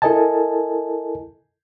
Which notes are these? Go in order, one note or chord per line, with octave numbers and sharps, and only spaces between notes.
E4 A4 A#4 D#5 G#5 A5